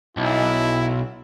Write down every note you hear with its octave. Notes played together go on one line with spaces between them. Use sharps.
B1 E4